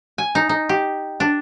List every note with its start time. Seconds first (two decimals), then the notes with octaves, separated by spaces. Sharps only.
0.18 G#5
0.35 D#4
0.49 D#4
0.69 G4
1.20 D4